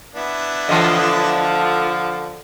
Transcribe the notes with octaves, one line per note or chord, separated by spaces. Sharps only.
B3 D4 E4
D3 E3 F3 A3 D#5